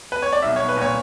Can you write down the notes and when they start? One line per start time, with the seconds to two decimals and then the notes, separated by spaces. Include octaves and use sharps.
0.12 B4
0.22 C#5
0.33 D5
0.42 B1 E5
0.56 B1 C#5
0.69 B4
0.77 A#2 C#5